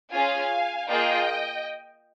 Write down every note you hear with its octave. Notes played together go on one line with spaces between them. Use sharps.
C#4 F4 G#4 F5 G#5
A#3 F4 G#4 D#5 G5